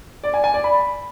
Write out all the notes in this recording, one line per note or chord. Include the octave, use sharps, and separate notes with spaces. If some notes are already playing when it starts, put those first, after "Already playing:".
D5
G#5
G#5
D5
B5